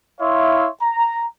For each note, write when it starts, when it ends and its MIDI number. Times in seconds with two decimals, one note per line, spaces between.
0.21 0.68 64
0.21 0.68 73
0.21 0.68 76
0.21 0.68 77
0.21 0.68 84
0.82 1.24 82